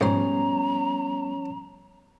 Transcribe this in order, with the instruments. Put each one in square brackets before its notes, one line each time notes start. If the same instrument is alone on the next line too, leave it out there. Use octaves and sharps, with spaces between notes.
[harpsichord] G#2 C6 [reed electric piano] F3 G3 B3 [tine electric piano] C#4 C#5 [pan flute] A#5